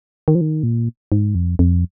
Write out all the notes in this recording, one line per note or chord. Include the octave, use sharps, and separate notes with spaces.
D#3
F3
D#3
A#2
G#2
F2
F2